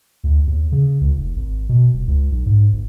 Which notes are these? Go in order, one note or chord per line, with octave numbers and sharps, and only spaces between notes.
D2
D#2
C#3
C#2
F1
G#1
B2
D#1
C#2
B1
G#2
G1